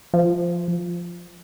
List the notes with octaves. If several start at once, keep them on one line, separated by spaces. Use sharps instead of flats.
F3